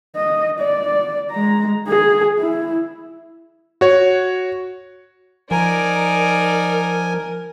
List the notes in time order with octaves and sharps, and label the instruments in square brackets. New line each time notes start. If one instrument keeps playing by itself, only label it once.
[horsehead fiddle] D#5
D5
G#3 A#5
G#4
E4
[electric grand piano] F#4 C#5
[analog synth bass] F3 [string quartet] D#4 D5 A#5 [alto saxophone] A#4 [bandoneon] G#5